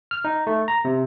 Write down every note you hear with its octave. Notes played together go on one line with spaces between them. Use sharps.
F6
D#4
A3
A#5
C3